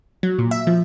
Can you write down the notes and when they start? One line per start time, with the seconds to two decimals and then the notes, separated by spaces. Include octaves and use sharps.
0.23 F#3
0.39 A#2
0.51 E5
0.67 F3